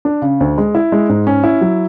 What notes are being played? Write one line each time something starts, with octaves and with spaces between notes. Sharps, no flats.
D4
C#3
D2
G#3
E4
G#3
G#2
C#4
E4
F#3